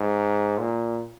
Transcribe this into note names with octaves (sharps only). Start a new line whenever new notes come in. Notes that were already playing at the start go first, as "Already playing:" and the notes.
Already playing: G#2
A#2